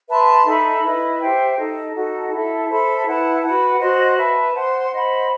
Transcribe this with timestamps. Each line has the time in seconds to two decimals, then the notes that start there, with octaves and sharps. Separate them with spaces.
0.09 B4 E5 A5 C6
0.46 D#4 A4 E5 B5
0.83 E4 B4 D#5
1.20 G4 C5 E5 G5
1.58 D#4 A4 D#5
1.95 D#4 F#4 A4 D#5
2.31 E4 A4 E5
2.69 A4 C5 E5 B5
3.06 E4 B4 F#5 A5
3.43 F#4 B4 F#5
3.80 F#4 C5 D#5
4.17 B4 E5 A5
4.54 C5 F#5 C6
4.91 C5 D#5 F#5 B5